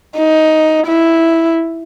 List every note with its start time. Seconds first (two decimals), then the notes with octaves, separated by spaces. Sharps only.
0.17 D#4
0.86 E4